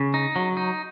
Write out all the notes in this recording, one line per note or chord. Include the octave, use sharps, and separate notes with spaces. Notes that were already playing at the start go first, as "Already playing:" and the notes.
Already playing: C#3
D#4
F#3
D#4